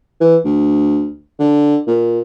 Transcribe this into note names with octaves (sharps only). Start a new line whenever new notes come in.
E3
D2
D3
A#2